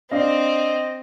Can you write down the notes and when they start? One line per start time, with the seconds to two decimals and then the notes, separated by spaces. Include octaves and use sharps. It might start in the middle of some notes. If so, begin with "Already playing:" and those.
0.11 C4 D4 D#5 F5